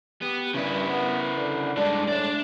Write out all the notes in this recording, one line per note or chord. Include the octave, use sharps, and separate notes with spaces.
B3 G4
G2 C#3 E4
B3
D3
G2 G#3 D4
A2 D4 D5